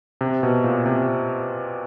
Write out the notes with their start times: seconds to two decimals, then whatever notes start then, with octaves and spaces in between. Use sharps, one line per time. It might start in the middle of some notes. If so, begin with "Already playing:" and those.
0.21 C3
0.43 B2
0.64 A#2
0.86 C3